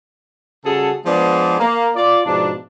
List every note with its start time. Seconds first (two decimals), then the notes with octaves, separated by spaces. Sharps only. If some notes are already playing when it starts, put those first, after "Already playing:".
0.65 C#3 G3 F#4 G#4 A4
1.05 F3 G#3 B3 D4 G#4 D5
1.59 A#3
1.96 F4 D5
2.26 G#2 B2 F3 D4